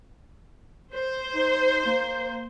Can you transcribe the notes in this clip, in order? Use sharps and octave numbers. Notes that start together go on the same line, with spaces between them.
C5
D#4
A#3